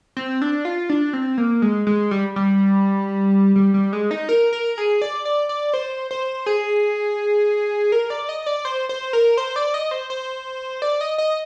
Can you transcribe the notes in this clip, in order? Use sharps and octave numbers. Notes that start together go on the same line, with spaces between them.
C4
D4
F4
D4
C4
A#3
G#3
G#3
G3
G3
G3
G3
G#3
D#4
A#4
A#4
G#4
D5
D5
D5
C5
C5
G#4
A#4
D5
D#5
D5
C5
C5
A#4
C5
D5
D#5
C5
C5
D5
D#5
D#5